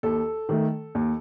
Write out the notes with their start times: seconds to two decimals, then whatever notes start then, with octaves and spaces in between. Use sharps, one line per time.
0.03 D#2 A4
0.49 D#3 A3
0.95 D#2